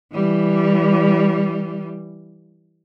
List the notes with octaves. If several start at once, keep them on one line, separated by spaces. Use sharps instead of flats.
E3 G3